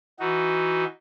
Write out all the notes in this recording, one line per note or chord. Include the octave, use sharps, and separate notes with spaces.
E3 D#4 F#4